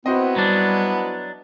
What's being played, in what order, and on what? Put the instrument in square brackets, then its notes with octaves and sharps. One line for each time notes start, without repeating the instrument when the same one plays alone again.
[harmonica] B3 E4 [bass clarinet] C4 [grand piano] F#4 C5 D#5
[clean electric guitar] F#3 D4 [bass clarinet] G3